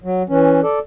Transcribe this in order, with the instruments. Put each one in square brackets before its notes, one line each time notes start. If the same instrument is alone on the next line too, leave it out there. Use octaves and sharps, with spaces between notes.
[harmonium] F#3
E3 C#4
A4 D5